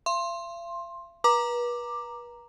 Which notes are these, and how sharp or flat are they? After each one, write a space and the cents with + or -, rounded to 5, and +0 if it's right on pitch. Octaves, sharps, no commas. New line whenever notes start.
F5 -45 C6 +15
B4 -35 A#5 +0 D6 +10